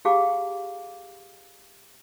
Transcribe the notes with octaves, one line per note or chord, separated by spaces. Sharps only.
F4 G4 G#4 F5 A5 D6